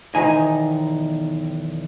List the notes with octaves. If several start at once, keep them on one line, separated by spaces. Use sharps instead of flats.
B1 E2 D#3 D#4 G#5